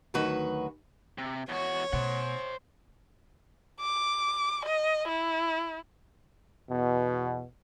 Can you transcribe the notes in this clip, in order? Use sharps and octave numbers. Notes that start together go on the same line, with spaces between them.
D2 D#3 F#3 F#4 B4
C3
E2 F#4 C#5
B2 C5 F#5
D6
D#5
E4
E2 B2